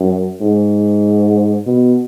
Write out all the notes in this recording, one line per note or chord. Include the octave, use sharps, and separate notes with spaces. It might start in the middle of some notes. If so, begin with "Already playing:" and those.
Already playing: F#2
G#2
B2